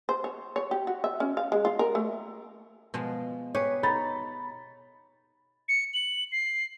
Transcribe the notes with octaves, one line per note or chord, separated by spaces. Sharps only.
C5
C#5
C#5
G4
F#4
E5
C#4
F5
G#3
F4
A#4
A3
B2 F3 G#3
G4 G#4 B4 C#5
D#4 B5 A6
C#7
F#7
C7